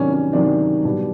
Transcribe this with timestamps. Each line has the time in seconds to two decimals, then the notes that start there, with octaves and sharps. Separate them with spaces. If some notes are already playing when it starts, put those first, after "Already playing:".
Already playing: C3 D#3 F#3 C#4 D4
0.13 C#4
0.32 C3 D#3 F#3 D4
0.85 B2 G3 D4